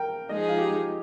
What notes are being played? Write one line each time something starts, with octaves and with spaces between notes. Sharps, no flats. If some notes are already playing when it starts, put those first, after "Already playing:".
Already playing: A#4 G5
F3 G#3 D#4 G#4 D#5
F4
G4